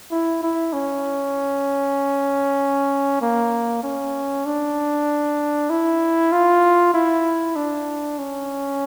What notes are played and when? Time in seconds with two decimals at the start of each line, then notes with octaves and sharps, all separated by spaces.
0.11 E4
0.43 E4
0.73 C#4
3.22 A#3
3.83 C#4
4.46 D4
5.70 E4
6.32 F4
6.94 E4
7.56 D4
8.19 C#4